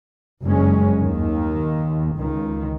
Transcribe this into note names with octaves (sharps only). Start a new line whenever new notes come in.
F#1 G2 G#3 C#4
D#2 D#3
C#2 D#3